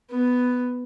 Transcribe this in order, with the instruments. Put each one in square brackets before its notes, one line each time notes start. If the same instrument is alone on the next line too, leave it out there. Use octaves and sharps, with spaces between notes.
[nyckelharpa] B3